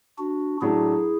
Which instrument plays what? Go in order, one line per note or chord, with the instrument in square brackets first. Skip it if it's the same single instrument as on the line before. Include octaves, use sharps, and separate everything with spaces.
[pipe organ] D4 F#4
[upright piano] A2 F#3 A3 D4 [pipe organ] E4 G#4